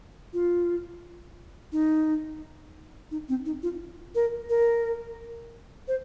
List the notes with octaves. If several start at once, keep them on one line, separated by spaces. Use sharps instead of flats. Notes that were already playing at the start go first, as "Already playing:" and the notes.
F4
D#4
D#4
C4
D#4
F4
A#4
A#4
C5